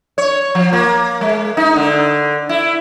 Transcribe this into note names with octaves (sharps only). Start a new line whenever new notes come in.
C#5
F3
A#3
G#3
D#4
D3
E4